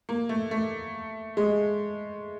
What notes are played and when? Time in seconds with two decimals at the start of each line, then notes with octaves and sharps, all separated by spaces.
0.09 A#3
0.29 A3
0.51 A3
1.37 G#3